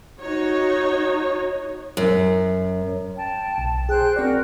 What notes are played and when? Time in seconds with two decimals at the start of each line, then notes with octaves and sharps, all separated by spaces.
0.20 D#4 F#4 C#5
1.97 F#2
3.17 G5 A5
3.58 B1
3.89 G#4 C5 G5 F#6
4.16 C4 F#4 A#4 D5